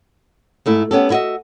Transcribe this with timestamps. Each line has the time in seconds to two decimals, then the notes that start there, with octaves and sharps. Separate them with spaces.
0.66 G#2 A3 E4
0.91 B3 C#4 G4 A4
1.10 E4 F#4 B4 D#5 E5